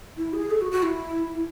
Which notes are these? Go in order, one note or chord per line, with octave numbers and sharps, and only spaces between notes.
E4
G#4
A4
F#4
F#4
E4